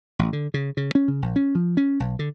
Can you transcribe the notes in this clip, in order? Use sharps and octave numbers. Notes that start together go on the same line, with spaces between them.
A1
D3
C#3
C#3
C#4
C#3
A#1
C#4
F3
C#4
B1
D3